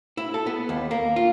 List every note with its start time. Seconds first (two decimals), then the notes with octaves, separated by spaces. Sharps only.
0.17 E4
0.34 A4
0.46 B3
0.69 D#2
0.91 A#3
1.16 F4